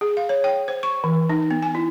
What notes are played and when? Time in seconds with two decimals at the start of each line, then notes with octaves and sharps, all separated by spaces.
0.01 G#4
0.17 F5
0.29 C#5
0.44 G5
0.68 C5
0.83 C#6
1.04 E3
1.30 D#4
1.51 B3
1.63 G#5
1.75 E4